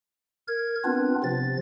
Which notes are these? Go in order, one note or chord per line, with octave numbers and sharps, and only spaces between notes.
A#4 G#6
B3 C4 D4 F4 B4
C3 F3 A6